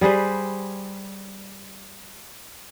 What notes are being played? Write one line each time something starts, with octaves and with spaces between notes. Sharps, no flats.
G3 G#4 B4 C5